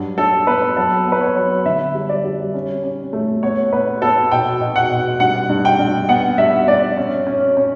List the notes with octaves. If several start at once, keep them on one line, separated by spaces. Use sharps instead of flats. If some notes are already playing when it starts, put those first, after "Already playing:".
Already playing: G2 F#3
G2 A4
B3 B4
F#3 A4
B3
B4
C#5
F#3
D3 E5
G3
D5
G3
C#4
C#4
A3
B3 C#5
B3 B4
B3 A4
B2 G5
B2
F#5
B2
G2 F#5
G2
G5
G2
B3 F#5
G2 E5
G2 D5
C#4
C#4
C#4